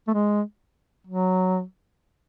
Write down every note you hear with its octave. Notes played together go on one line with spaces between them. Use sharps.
A3
G#3
F#3